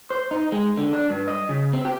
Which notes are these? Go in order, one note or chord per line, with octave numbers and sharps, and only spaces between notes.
C5
D#4
G#3
D3
D4
G2
D#5
C#3
C4
G4